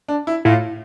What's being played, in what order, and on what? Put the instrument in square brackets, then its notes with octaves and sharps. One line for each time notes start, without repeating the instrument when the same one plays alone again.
[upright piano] D4
E4
[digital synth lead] A2 [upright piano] F4